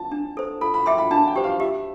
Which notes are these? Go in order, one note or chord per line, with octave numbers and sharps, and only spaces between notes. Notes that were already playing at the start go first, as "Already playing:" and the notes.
Already playing: A5
D4
A4 C5
A4 B5
B5
E5 G5 C6 D6
B5
D4 A5
G5
G4 C5
F5
G4 E5